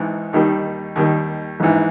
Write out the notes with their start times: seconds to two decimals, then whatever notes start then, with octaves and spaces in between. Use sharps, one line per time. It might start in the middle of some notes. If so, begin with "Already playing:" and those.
Already playing: G#1 G#2 E3
0.33 D#2 D#3 G3
0.96 D#2 D#3 G3
1.60 A#1 G#2 E3